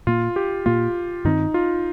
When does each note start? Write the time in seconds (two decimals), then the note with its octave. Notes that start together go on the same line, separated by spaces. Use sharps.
0.07 A#2 A#3 F4
0.36 G4
0.66 A#2 A#3 F4
1.25 G2 D#3 C4 D#4
1.54 F4